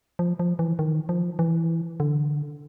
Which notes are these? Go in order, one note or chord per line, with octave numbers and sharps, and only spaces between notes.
F3
F3
E3
D#3
F3
E3
D3